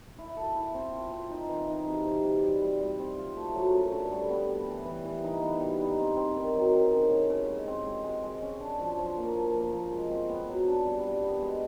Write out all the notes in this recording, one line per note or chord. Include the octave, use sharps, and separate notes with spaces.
E4
A4
E4
C4
F4
C4
D#4
E3
D#4
C3
C3
C3
G3
G3
G3
C4
F4
A3
F#3
F#2
D3
G3
B3
G3
E3
E3
E3
D#4
B3
G3
D#4
C4
C4
D#3
F#3
D#3
C#3
C#3
C#3
G#3
C4
G#3
G#3
G#3
C#4
D4
F3
F3
A#3
F3
A#3
F3
G#3
C4
B3
F#3
D4
G3
G3
B3
G#3